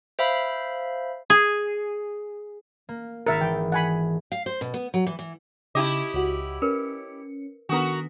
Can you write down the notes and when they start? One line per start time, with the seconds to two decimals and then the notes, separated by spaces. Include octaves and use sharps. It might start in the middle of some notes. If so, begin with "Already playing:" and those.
0.19 C5 E5 F5 B5
1.30 G#4
2.89 A#3
3.26 G#1 A#4 E5 A6 C#7
3.41 E3 G5
3.72 F#5 G#5 B5
4.32 F5
4.46 C5
4.61 B2
4.74 B3
4.94 F#3
5.07 E3
5.19 E3
5.75 C#3 D#4 E4 G4 D#5 A#5 D6
6.14 C#2 F#4
6.62 C#4 A#4 B4
7.69 D#3 B3 D4 F#4 A4 A#4